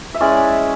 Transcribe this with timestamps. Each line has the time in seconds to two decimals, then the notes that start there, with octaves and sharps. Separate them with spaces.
0.14 E5
0.20 G#3 C#4 E4 D5